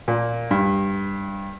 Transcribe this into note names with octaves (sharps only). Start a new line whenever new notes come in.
A#2
G2